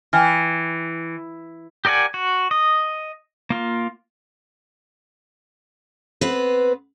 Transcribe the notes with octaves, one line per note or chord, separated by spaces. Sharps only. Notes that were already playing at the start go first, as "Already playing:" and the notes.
E3 G5 G#5 F6
G4 A#4 D5 F#5 G#5
F#4
D#5
A#3 F4
B3 C4 B4